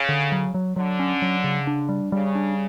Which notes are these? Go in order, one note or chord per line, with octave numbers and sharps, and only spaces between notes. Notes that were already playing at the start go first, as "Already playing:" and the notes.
Already playing: C#3
D3
F#3
F#3
D3 F#3
C#4
F#3
C#3
D4
G3
C#3 G3
D4